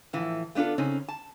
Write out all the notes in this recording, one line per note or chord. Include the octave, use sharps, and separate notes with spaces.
A2 E3 F3
A3 B3 D4 F4 A4
C#3 C4 C#4 D#4
A5